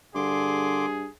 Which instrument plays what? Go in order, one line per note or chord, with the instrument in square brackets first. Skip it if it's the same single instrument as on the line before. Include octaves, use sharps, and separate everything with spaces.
[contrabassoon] G2 [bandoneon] D3 C6 D6 [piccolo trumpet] G#4